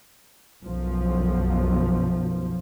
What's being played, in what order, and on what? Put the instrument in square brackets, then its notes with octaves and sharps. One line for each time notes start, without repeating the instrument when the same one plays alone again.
[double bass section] B1 F#2 F3